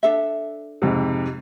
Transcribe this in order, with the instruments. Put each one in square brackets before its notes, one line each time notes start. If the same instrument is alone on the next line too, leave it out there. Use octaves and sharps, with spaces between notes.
[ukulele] D4 A4 E5
[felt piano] F2 G#2 C3